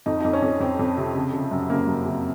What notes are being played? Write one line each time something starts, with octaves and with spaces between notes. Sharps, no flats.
F2 D#4
F2 D#4
C#4
F2
F2 C4
F2
C3
C#3
C#3
F#2
C#3 A#3
F#2
C#3